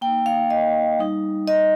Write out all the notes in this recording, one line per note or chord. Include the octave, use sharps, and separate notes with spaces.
A#3 D#4 G5
F5
D#5
G3 D#4
D#5